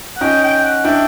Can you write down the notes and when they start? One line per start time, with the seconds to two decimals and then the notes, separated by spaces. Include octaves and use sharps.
0.16 F#5
0.21 C#4 D#4 G5
0.43 G5
0.64 F#5
0.84 D4 E4 G5